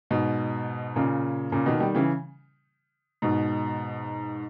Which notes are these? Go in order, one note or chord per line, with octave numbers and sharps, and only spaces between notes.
G#2 B2
A#2 C#3
A#2 C#3
B2 D#3
D#3 G3
C#3 E3
G#2 B2